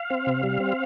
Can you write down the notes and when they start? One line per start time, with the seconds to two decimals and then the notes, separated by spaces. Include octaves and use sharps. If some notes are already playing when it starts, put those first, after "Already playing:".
Already playing: F5
0.10 C4
0.27 C3
0.43 G3
0.60 C4